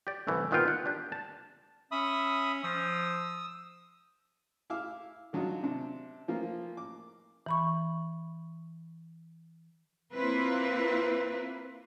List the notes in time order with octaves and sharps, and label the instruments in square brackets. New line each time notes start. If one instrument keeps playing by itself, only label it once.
[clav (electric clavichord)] G4 D5
C2 E3 A3
A#2 D#3 B3 C4 F4 G5
F#5
D4 G4
A5
[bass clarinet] C#4 [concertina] E5 B5 D#6
[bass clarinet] F3 [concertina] D#6 E6
[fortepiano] E4 F5 D6 E6 F6
D#3 F#3 D4 D#4 F4
C3 D4
E3 F3 A#3 F4
D6
[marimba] E3 B5 C#6
[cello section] A#3 C4 E4 F4 B4